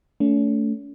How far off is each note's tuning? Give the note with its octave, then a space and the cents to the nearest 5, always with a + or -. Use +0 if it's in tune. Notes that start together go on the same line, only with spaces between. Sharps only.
A3 +0 C#4 +40